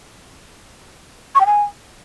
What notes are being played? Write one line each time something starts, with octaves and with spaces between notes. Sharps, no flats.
C#6
G5
G#5